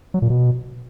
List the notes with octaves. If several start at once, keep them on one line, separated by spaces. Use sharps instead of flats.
F#3
A#2
B2